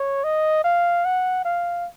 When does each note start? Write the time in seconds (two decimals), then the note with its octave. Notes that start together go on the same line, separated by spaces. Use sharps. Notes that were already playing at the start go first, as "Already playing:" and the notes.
Already playing: C#5
0.24 D#5
0.64 F5
1.05 F#5
1.45 F5